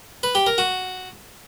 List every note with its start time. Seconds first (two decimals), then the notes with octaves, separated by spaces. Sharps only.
0.23 B4
0.35 G4
0.46 A#4
0.58 F#4